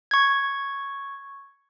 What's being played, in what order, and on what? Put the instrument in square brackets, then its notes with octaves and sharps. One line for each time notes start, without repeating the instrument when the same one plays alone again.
[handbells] C#6 G#6